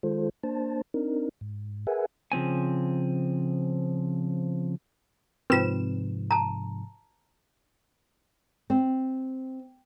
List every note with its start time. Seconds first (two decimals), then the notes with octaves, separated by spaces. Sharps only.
0.03 D#3 G#3 F4 A4 C5
0.43 A#3 D4 C5 A5
0.94 C4 D4 D#4 A#4
1.41 G#2
1.87 G#4 A#4 B4 E5 F#5 G#5
2.32 C#3 F3 C4 G#5
5.50 G#2 C3 F3 C4 F4 B4 E7
6.31 A5 A#5
8.70 C4